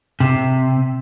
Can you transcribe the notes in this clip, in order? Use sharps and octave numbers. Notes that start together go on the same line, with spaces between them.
C3